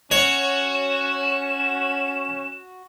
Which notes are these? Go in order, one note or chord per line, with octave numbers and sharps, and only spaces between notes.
C#4 F#4 C#5 E7